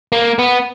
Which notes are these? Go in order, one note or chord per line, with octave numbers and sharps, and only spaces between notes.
A#3
B3